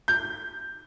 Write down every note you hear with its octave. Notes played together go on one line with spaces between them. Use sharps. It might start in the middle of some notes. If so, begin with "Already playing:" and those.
G6